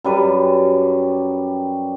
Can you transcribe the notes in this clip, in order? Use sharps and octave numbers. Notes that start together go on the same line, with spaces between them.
F#2 G3 B4